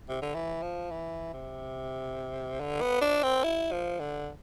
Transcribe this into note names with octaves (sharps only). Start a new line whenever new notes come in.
C3
D3
E3
F3
E3
C3
D3
B3
D4
C4
E4
F3
D3